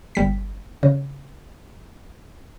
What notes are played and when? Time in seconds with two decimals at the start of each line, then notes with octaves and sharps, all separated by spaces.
0.15 G1 G3 B6
0.83 C#3